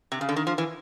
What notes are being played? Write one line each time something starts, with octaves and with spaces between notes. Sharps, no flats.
C3
C#3
D3
D#3
F3
E3